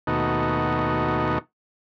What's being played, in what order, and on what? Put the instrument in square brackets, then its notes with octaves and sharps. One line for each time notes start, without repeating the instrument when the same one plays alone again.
[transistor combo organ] D#2 B2 A3 D#4 F#4